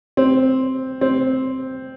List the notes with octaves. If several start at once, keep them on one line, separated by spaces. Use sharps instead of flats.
C4
C4